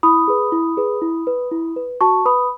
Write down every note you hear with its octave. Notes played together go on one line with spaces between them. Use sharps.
E4 B5 D#6
G#4 B4
E4
G#4 B4
E4
B4
E4
B4
F#4 A5 C#6
B4 B5 D#6